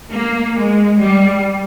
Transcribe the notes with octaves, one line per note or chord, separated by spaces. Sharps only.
A#3
G#3
G3